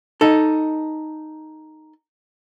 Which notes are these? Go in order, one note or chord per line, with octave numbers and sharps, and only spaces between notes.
D#4 A4